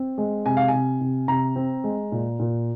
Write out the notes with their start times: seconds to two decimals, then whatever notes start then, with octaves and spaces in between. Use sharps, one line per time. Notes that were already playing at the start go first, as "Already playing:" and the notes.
Already playing: C4
0.18 G#3
0.46 C3 G#5
0.57 F5
0.68 C3 G#5
1.01 C3
1.28 C3 A#5
1.56 C4
1.84 G#3
2.12 A#2
2.39 A#2